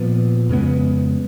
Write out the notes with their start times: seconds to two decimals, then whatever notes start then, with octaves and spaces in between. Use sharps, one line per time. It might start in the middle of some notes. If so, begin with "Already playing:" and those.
Already playing: A#2 F3 B3
0.49 F2 C#3 G#3 B3